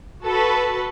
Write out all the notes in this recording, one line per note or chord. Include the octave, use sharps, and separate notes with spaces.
F#4 A4 B4